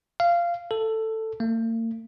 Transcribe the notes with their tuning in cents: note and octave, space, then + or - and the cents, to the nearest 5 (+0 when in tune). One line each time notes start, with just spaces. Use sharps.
F5 -15
A4 +10
A#3 -45